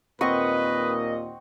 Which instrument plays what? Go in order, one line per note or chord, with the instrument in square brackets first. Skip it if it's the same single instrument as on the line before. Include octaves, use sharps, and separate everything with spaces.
[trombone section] D#2 A#2 D#3 [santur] C4 F#5 C#6 [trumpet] B4 [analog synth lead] D#5